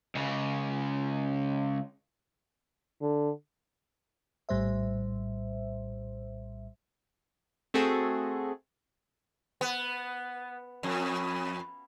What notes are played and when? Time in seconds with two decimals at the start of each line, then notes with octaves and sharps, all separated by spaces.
0.15 C#2 C#3
3.01 D3
4.49 A#1 A2 G3 C5 E5
7.74 A3 C4 F#4 G#4 A4
9.61 B3
10.83 F2